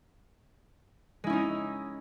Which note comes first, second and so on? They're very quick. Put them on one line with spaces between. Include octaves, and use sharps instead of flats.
G#3 E4 C#4 D#4